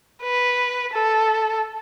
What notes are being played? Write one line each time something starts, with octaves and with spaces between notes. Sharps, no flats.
B4
A4